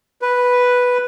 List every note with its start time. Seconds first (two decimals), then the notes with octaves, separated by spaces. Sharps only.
0.22 B4